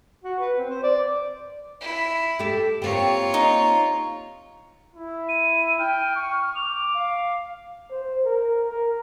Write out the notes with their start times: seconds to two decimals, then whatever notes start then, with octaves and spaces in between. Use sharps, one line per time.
0.23 F#4
0.39 B4
0.58 C4
0.70 C5
0.83 D5
1.81 E4
2.39 G4 A4 E5
2.82 A#3 C4 F4 G4 C#5
3.34 D#4
4.94 E4
5.29 D#7
5.79 G5 F6
6.16 C#6
6.56 D6 F7
6.94 F5
7.91 C5
8.25 A#4
8.68 A#4